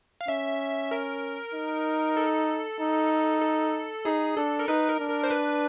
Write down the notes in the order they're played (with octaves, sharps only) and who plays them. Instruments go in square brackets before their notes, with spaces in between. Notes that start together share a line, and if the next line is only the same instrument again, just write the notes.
[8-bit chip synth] F5
[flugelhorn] C#4 [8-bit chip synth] E5
[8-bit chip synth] A#4
[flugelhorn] D#4
[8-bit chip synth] A4
[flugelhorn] D#4
[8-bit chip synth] A4
[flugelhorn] D#4 [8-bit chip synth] G#4
[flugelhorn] D4 [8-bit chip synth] A4
[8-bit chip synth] A#4
[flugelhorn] D#4 [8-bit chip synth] B4
[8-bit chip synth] A#4
[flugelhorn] D4
[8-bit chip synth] A#4
C5
B4